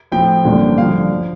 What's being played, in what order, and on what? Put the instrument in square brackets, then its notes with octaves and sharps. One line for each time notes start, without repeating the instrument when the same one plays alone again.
[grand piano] A2 F3 C4 G5
A1 G2 D3 F3 A#3
G2 D3 F3 F5
F3